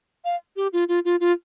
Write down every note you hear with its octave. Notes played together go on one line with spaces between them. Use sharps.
F5
G4
F4
F4
F4
F4